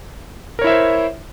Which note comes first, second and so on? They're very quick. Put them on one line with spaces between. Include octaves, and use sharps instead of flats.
A#4 C#5 E4 E5 C5